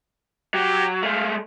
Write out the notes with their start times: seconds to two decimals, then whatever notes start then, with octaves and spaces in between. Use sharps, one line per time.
0.54 F#3 G4
1.03 G#3 A3 F5